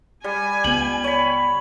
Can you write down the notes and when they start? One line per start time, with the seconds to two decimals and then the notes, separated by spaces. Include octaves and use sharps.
0.24 G3 G#5
0.64 C#2 B3 F#7
1.04 C#5 B5